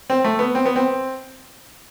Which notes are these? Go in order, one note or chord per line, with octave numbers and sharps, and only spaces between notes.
C4
A3
B3
C4
B3
C4